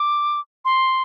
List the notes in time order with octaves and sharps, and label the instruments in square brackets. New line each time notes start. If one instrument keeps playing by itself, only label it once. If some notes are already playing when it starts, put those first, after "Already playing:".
Already playing: [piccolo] D6
C6